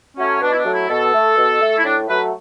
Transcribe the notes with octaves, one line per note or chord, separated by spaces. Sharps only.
F#3 A3 C#4
B2 D4
E4
D4
F#3 A3
E4
B2 A4
A3
B2
A3
E4
A2 D4
F#3 A3 B4